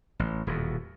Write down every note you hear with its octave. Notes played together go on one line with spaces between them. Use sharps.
A1
D#1 E2 B2